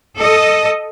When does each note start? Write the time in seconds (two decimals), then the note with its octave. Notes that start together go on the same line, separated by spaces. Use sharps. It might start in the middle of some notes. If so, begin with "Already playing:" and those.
0.18 A4 D#5